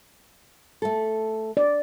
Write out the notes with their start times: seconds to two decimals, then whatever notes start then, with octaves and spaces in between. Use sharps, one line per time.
0.82 A3 A4
1.57 D5